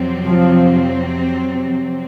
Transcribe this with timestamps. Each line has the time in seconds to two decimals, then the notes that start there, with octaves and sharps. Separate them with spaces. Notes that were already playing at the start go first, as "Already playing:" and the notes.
Already playing: F2 C3 F#3 C4
0.25 F3